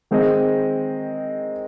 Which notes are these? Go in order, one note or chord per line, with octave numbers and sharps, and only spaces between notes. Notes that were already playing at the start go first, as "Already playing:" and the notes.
D#3 G#3 C4 G#4 D#5